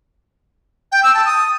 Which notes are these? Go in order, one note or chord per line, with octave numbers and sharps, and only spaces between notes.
G5
E6
A5
D#6